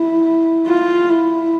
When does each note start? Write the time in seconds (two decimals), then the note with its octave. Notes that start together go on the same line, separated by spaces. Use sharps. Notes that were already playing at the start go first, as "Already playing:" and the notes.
Already playing: E4
0.67 F4
1.10 E4